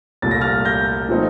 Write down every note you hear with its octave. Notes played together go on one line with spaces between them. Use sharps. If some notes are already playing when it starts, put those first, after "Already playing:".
C2 A#2 A3 A6
A#6
F6 A6
G6 A#6
A#2 F3 A3 C4 D#4